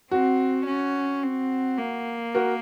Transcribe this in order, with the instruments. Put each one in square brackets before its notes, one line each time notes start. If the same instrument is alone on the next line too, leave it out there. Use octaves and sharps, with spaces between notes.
[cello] C4 [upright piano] F#4
[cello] C#4
C4
A#3
[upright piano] F#4 A#4